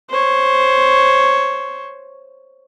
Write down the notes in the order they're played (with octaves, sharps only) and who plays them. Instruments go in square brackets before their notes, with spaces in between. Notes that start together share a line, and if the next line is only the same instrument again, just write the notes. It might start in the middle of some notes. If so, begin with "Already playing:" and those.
[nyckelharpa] C5 C#5